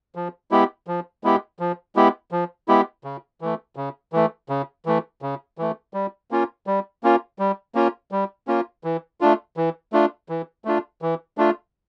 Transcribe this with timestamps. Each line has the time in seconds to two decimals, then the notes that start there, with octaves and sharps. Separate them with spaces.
0.15 F3
0.51 G#3 B3 E4 G4
0.87 F3
1.24 G#3 B3 E4 G4
1.59 F3
1.96 G#3 B3 E4 G4
2.32 F3
2.68 G#3 B3 E4 G4
3.04 C#3
3.41 E3 A3
3.76 C#3
4.13 E3 A3
4.49 C#3
4.86 E3 A3
5.22 C#3
5.58 E3 A3
5.94 G3
6.31 A#3 C#4 F4
6.67 G3
7.03 A#3 C#4 F4
7.39 G3
7.75 A#3 C#4 F4
8.12 G3
8.47 A#3 C#4 F4
8.84 E3
9.21 A3 D4 F4
9.57 E3
9.93 A3 D4 F4
10.29 E3
10.65 A3 D4 F4
11.02 E3
11.38 A3 D4 F4